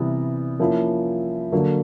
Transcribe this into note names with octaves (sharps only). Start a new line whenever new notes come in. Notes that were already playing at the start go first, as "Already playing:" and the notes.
Already playing: C3 E3 G3 B3
F3 A#3 C#4 E4
D3 F#3 A#3